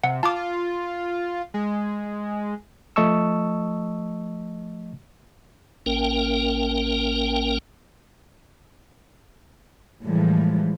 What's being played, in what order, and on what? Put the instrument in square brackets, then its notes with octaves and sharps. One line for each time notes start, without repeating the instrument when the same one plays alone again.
[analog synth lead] C3 [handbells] F#5
[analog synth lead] F4 [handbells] A5 D6
[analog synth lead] G#3
[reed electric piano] F3 A3 D#5 A5 C#6 E6
[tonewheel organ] A1 A#3 C#4 A#4 G5
[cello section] A2 E3 F3 G3 G#3